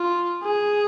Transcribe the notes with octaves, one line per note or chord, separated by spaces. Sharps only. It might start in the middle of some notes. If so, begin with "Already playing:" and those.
Already playing: F4
G#4